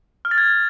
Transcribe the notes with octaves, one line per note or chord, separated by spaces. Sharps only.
F6
A6
G#6